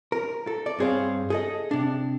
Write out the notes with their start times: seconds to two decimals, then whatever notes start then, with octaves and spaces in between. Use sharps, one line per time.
0.12 A#4
0.47 A4
0.66 D5
0.79 G2 C4 G#4 C5 C#5 F5
1.30 G#4 A4 D#5
1.71 C3 D4